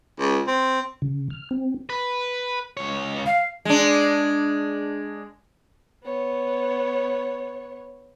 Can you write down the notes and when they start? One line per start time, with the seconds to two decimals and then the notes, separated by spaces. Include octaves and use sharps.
0.19 C#2
0.47 C4
1.02 C#3
1.30 F6
1.51 C4
1.90 B4
2.77 C#2 C#5
3.26 F5
3.65 G#3 D4
6.03 B3 C#5